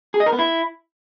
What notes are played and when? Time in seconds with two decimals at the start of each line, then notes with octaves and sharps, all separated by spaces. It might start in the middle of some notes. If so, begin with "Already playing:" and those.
0.14 G#4
0.20 D#5
0.26 A#4
0.32 B3
0.39 E4